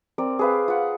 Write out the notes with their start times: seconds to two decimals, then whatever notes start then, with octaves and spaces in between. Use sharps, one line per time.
0.18 C4 A#4 D5
0.39 G#4 B4 F5
0.68 F4 F#5